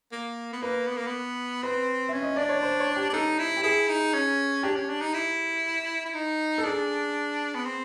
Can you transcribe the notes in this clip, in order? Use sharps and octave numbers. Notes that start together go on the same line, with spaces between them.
A#3
B3
A#3 B4
B3
A#3
B3
C4 B4
C#4 E5
D#5
D4 D5
C#5
C5
C#5
G4
D4
D#4 A4
E4
G4
E4 G#4
D#4
C#4
D4 G4
C#4
D4
D#4
E4
E4
D#4
A4
D4 G#4
B3
C4